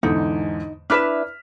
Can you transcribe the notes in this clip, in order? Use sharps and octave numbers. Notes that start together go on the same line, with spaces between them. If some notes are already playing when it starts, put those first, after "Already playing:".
E2 G#2 D3 D#4
D4 E4 B4 F6 B6 E7